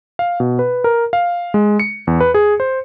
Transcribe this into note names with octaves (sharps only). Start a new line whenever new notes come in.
F5
B2
B4
A#4
F5
G#3
C#7
E2
B4
G#4
C5